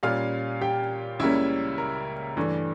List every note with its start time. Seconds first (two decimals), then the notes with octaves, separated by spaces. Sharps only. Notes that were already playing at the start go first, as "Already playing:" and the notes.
0.03 A#2 G3 C#4 F4 F5 F6
0.61 G4 G5
1.19 C#2 C#3 G3 A#3 C#4 E4 E5
1.78 A#4
2.37 G2 E3 A3 D4